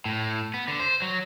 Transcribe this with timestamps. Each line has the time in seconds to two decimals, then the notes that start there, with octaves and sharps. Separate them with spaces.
0.06 A2
0.54 B3
0.68 D3
0.80 C5
1.02 F#3